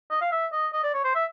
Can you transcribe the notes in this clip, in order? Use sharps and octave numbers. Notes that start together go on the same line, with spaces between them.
D#5
F5
E5
D#5
D#5
D5
C#5
C5
E5